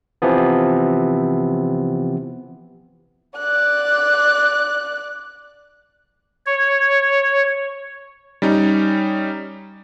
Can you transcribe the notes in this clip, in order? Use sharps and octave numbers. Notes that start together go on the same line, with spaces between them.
C3 E3 F3 B3
D5 F#6
C#5
G3 C#4 D#4